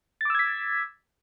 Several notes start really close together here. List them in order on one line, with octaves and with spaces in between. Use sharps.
A6 D6 E6 G#6 B6